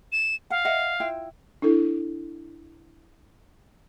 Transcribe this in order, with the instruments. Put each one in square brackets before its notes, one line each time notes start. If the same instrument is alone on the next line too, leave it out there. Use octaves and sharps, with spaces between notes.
[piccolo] E7
[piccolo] F5 [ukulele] F#5
[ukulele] D#5 E5 F#5
E4 F4 G5
[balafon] D4 E4 A4